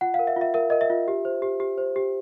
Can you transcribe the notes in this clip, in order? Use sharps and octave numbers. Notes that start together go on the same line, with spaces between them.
F4 F#5
F5
A#4
E5
F4
E5
A#4 E5
A#4 D#5
E5
F4
G4
C5
G4
G4
C5
G4